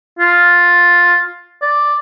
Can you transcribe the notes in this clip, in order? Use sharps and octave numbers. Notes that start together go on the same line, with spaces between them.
F4
D5